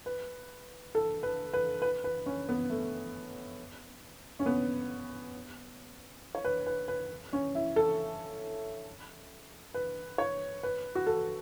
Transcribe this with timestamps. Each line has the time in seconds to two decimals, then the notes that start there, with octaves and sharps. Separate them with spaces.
0.06 B4
0.95 A4
1.23 B4
1.53 B4
1.82 B4
2.04 B4
2.26 C#4
2.49 B3
2.70 A3
4.39 C#4
4.46 B3
6.35 C#5
6.45 B4
6.67 B4
6.88 B4
7.33 C#4
7.55 E4
7.76 A4
9.74 B4
10.18 C#5
10.63 B4
10.95 F#4
11.06 A4